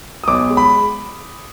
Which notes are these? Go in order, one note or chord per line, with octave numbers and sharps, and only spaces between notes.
D#6
B1 D6
G#3
B5